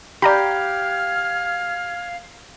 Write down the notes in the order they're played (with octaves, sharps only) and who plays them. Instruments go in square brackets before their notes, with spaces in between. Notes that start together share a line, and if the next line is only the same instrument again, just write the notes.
[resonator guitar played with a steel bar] G4 [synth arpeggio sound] D5 A#5 B5 [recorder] F5 [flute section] F6 G#6